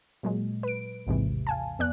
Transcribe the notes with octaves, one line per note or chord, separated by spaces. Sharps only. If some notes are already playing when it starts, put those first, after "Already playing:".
A#2 F#3 G#3
B4 D7
A1 D#2 G#2 C3 E3
F5 G#5 A5
F2 B3 D5 F#6